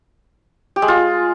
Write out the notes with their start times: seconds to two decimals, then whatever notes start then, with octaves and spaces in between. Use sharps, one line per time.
0.76 G4
0.82 G#3
0.88 F4